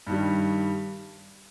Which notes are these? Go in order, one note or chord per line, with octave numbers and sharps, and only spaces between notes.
G2 D#3 G3